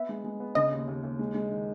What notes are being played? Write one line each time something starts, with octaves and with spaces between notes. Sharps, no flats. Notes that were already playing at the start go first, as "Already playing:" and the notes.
Already playing: B3 E5
G#3
G#3
B3
C#3 D#5
D#2
D#2
D#2
G#3
G#3
D#3